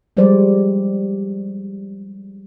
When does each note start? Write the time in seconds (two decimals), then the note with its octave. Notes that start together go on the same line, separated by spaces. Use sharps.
0.17 F3 G3 G#3 G#4 C5 D5